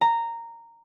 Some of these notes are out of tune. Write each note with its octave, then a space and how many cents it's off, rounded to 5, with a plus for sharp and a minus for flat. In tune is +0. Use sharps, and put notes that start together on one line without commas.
A#5 -10